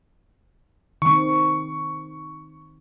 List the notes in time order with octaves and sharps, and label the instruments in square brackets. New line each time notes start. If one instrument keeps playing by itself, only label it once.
[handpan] D#3 C4 [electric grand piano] C#6